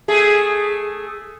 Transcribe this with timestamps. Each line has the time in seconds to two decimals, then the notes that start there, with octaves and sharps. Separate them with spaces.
0.08 A3 G#4